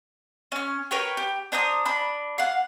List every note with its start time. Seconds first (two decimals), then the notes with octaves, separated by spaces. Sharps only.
0.52 C#4 F6
0.91 A#4 B4 C#5 G5
1.17 G4
1.52 D4 C5 A#5 D#6
1.85 D4 B5
2.38 F5 F#5